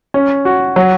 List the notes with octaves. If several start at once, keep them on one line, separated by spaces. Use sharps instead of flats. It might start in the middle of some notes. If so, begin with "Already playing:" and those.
C#4
F#4
F#3